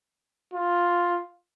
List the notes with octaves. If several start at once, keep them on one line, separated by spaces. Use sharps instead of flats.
F4